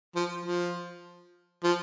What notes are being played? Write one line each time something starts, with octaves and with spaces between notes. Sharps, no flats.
F3
F3
F3